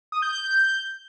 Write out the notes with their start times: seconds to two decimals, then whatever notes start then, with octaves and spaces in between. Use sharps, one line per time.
0.12 D#6
0.22 G6
0.32 G6